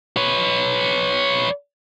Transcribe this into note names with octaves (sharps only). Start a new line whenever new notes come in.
B4 C#5